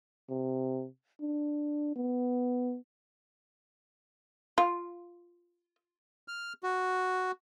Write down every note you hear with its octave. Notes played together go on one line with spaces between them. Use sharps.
C3
D4
B3
F4
F6
F#4